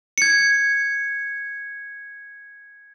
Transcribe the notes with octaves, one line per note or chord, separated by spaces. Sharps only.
G#6 C#7